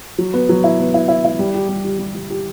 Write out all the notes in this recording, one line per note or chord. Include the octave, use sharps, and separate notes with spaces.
F#3
B3
F#3
E4
B3
E4
E4
E4
G3
G4
G3
G4
G3
G3
G4